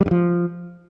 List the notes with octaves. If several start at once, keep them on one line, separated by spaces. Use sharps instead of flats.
G3
G2
F3